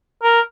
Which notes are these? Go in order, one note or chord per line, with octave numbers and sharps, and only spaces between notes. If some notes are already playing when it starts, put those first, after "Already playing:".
A#4